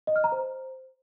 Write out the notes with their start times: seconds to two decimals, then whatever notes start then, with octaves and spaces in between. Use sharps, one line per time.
0.07 D#5
0.16 F6
0.24 A#5
0.32 C5